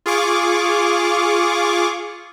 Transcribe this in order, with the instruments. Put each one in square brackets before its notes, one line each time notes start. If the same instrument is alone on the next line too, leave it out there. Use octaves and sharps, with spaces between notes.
[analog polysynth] F4 G#4 C#6 D6